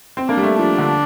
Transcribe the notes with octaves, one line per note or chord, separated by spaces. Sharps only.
C4
A#3 D4
G3
A3
F3 D4
D3